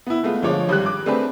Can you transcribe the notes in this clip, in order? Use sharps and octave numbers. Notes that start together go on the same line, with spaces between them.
B3 E4
G#3 A3 B3 F4
G1 F3 G#3 C#5 D6
G#1 G3 G4 F#6
D6
A3 C4 D4 G4 G#4 B4